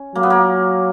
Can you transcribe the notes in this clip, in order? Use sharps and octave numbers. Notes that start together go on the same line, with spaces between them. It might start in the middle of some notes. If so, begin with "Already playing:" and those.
Already playing: C#4
F#3 A#3
B3
A#3